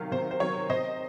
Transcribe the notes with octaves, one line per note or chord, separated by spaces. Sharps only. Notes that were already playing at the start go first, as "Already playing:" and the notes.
Already playing: C3 D#3 F#3 F5
C3 C5
C5
D#3 F#3 C#5
C3 C5 D#5